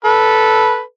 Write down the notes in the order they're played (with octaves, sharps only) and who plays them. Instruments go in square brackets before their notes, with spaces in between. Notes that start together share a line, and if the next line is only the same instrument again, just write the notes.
[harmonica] A4 B4